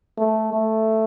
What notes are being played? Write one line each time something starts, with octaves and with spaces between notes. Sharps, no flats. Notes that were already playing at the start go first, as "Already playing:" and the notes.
A3
A3